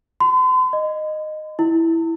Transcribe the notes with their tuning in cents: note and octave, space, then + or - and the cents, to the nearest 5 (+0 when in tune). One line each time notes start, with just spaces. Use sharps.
C6 -45
D#5 -15
E4 +0